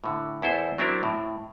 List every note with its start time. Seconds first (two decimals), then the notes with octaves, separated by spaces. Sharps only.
0.04 A2 D3
0.42 E2 E4 A4 C5
0.78 F#3 C4 D4 E4 A#4
1.03 A2